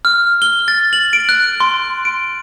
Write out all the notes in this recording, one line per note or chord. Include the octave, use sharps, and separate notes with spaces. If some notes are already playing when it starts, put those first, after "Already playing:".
F6
G7
A6
F#7
D7
F#6
C6
D7